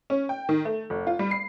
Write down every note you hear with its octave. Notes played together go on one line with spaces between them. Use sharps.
C#4
G5
D#3
A3
F1
F4
G3
C7